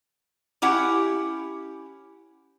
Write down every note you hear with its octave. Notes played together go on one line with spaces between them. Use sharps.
C#4 E4 G4 F#5